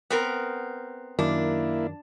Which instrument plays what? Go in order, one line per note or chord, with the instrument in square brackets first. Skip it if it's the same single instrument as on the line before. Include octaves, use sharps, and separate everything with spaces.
[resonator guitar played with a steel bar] B3 C4 A#4
[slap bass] F#2 D#3 [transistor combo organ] A#3 E4 [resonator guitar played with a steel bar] D4